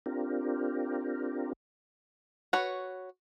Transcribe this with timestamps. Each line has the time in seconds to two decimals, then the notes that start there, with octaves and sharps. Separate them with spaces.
0.06 C4 D4 F4 G4 A#4
2.53 F#4 B4 C#5